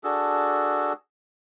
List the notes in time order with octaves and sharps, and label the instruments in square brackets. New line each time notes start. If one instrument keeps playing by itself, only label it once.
[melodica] D4 F#4 G#4 A4